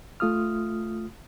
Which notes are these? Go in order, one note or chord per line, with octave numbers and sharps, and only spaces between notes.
A3 F4 D#6 F6